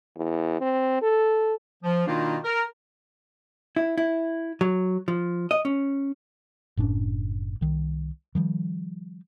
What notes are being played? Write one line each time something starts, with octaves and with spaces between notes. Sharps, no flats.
E2
C4
A4
F3
B2 D#3 A#3 D4 D#4 F4
A#4
E4
E4
F#3
F3
D#5
C#4
F#1 A2 C#4 D4
C2 D#3
D#3 F3 G3